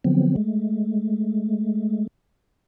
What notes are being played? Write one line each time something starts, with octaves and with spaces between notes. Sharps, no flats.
D3 F3 F#3 B3 C4
G#3 A3